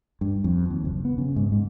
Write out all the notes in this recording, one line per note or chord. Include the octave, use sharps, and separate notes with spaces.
G2
F2
D#2
F#1
B3
C#3
G#2
G#2